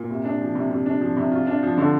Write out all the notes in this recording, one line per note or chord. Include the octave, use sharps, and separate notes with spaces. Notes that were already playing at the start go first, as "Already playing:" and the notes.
Already playing: A#2
C3
D4
F3
C3
C3
D4
F3
C3
F4
D4
F3
D3